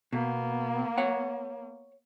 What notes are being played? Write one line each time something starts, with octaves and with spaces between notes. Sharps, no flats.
B2 A#3 B3
C#5 F#5